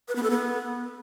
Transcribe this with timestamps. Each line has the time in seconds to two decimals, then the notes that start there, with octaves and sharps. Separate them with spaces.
0.08 B4
0.16 B3
0.23 A4
0.30 B3